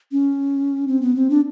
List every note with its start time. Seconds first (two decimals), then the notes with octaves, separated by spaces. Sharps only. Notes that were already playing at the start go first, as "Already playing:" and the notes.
0.12 C#4
0.88 C4
1.02 B3
1.16 C4
1.30 D4